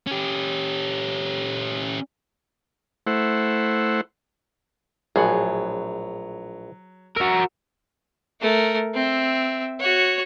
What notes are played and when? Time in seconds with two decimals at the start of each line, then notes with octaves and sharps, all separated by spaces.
0.07 C#4 G4
3.07 A3 E4 C5 F#5
5.16 A#1 A2 F#3 G#4 F#5
7.16 F#4 A#4 E6
8.40 A3 A#4
8.94 C4 E5
9.80 F#4 C#5